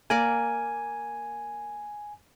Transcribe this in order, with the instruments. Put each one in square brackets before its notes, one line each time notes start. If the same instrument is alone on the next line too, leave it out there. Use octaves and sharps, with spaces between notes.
[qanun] A#3 A#4 D5 [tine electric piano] G#5